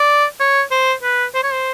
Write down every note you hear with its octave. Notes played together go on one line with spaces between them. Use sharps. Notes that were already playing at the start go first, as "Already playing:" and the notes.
Already playing: D5
C#5
C5
B4
C5
C#5
C5